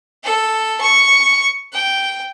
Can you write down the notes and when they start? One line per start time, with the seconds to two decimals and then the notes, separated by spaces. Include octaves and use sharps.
0.24 A4
0.81 C#6
1.72 G5